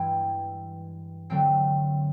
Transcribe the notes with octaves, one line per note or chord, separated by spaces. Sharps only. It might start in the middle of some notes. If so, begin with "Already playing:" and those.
Already playing: G2 E3 G#3 G5
D3 F#3 A3 C4 G5